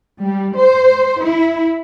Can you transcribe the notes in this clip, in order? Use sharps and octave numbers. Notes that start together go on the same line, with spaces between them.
G3
C5
E4